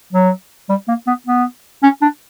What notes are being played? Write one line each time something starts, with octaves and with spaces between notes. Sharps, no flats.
F#3
G3
A#3
B3
B3
C#4
D4